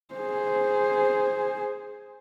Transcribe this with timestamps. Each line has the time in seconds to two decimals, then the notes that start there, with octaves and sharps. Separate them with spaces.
0.15 G#4 C5